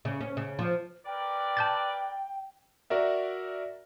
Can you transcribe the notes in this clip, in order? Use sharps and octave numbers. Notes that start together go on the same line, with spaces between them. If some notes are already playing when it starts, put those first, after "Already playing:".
C#3
C#4
C#3
F3
A#4 B4 D5 G5
A5 G6 A6
F#4 A#4 D5 E5